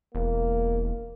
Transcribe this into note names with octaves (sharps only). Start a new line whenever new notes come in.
E1 A#3